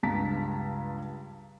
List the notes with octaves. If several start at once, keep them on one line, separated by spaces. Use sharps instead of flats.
C#2 G2 A5 A#5 B6